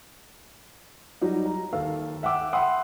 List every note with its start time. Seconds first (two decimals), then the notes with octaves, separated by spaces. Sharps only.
1.21 F#3 G3 D#4
1.45 A#5
1.72 D#2 A4 F5 E6
2.23 E5 F#5 G5 D6 E6
2.53 F#5 G5 B5 C6 D#6 E6